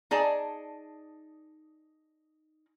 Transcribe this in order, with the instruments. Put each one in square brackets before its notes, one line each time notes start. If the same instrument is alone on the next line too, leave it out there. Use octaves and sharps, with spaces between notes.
[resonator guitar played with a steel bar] D#4 G#4 D5 A5